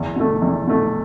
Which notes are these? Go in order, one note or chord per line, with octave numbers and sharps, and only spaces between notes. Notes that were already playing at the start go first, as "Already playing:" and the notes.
Already playing: E2
B2 A3
E2
B2 A3